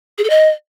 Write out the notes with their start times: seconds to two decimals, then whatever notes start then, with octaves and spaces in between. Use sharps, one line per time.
0.18 G#4
0.24 A4
0.30 D#5